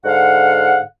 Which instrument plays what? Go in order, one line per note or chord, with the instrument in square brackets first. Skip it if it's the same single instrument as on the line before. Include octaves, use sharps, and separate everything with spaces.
[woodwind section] G#2 D3 F5 F#5